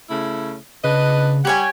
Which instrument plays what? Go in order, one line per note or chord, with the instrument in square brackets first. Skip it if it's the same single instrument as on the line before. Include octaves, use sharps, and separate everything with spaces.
[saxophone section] C#3 A3 E4
[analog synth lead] C#3 [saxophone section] D4 B4 D#5
[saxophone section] G3 F#5 [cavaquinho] G4 C#5 G#5